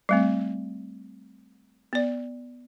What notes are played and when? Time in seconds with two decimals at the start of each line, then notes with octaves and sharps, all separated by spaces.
0.09 G3 A3 C4
1.93 B3 D5